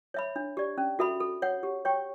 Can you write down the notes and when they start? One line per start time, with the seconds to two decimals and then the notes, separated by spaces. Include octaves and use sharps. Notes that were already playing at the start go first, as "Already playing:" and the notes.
0.14 C#5 E5 B5
0.36 D4
0.57 G4 D5
0.78 C#4
0.99 F#4 A4 E5 B5
1.20 A4
1.42 C#5 F#5
1.63 G4
1.85 C#5 G5 C#6